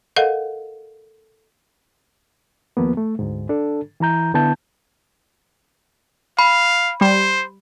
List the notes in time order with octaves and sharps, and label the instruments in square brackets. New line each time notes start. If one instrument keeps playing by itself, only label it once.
[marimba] A4 A#4 D#5 F5 F#5
[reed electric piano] D#2 F3 A#3 B3
A3
D2 G#2
D4 A4
E3 E4 A#5 G6
D3 B3 E4 A5 G6
[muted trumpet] F5 [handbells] B5
[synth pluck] G3 [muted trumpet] C5